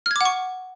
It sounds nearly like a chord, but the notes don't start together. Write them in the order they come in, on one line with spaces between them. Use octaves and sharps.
F6 G#6 D6 F#5 C#6